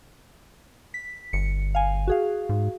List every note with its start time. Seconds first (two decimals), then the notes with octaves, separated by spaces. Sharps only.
0.94 B6
1.33 G1 C#7
1.75 F5 G#5
2.07 F#4 G#4 F5
2.49 G#2